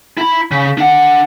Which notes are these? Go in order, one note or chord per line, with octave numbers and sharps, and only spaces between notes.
E4 B5
C#3
D4 F#5